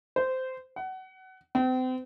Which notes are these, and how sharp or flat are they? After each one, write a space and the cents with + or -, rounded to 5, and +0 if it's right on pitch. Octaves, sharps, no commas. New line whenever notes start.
C5 -15
F#5 +25
C4 -35